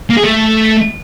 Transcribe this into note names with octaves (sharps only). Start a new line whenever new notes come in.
A#3
G#4
A3